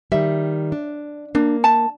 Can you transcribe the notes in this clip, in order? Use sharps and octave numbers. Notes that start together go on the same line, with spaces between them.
D#3 G3 E5
D4
A#3 D4
A5